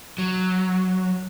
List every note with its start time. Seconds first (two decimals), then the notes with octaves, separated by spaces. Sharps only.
0.18 F#3